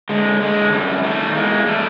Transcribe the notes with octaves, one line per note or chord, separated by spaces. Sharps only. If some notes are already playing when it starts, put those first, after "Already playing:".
D3 G#3
D3 G#3
F#2 G3
D#3 G3 A3
E2 G#3 A#3
G3 A3